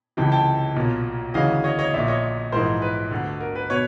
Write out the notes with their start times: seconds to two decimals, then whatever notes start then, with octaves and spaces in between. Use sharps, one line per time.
0.17 C#2 C3 E3 G5 A5
0.32 G5 A5
0.76 B1 A#2
1.34 D2 C#3 E3 D#5 F5
1.64 C#5 D#5
1.79 C#5 D#5
1.93 A#1 A#2 D5 E5
2.08 C#5 D#5
2.52 A#1 G#2 E3 A#4 C5
2.82 B4
3.11 D2 D3
3.41 A#4
3.55 B4
3.70 B2 B4 C#5